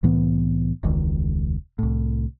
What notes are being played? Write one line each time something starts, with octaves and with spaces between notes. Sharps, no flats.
C2 A2 E3 B3
E1 C#2 D#3
C2 A2